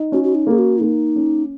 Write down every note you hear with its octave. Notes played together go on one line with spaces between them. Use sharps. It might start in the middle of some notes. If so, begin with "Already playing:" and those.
Already playing: D#4
C#4 F#4
F#4
D#4
A#3 G#4
F#4
A#3 D#4
C#4